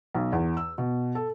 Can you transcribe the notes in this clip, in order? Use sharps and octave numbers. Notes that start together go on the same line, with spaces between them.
B1
E2
E6
B2
A4